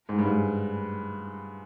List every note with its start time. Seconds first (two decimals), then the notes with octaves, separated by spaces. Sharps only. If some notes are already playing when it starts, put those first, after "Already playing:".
0.09 G#2
0.18 G2
0.24 G#2